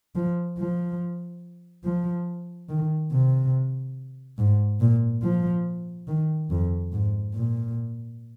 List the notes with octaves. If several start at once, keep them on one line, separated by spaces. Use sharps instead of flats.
F3
F3
F3
D#3
C3
G#2
A#2
F3
D#3
F2
G#2
A#2